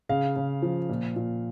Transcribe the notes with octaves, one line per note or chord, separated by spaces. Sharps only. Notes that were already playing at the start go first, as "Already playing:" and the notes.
C#3 F5
C#3
F3
A#2
A#2